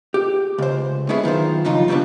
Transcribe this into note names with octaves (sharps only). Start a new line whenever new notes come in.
G4
C#2 C5
G#3 B3 C#4 E4 G#4 B4
F#2 D#3 F4 C5
G2 C#3 F3 F#3 D#4 F4
C#3 G3 A3 B3 D4